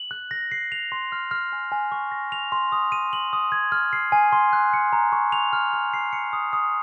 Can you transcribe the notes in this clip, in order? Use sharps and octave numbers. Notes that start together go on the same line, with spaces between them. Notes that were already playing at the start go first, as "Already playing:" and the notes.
Already playing: F#7
F#6
A#6
C7
F7
C6
F6
F6
G#5
G#5
C#6
A#6
F7
C6
D#6
D#7
F#7
D#6
G#6
F6
C7
G#5
C6
F#6
C#7
A#5
C#6
F7
F6
F6
C7
C#7
D#6
D#6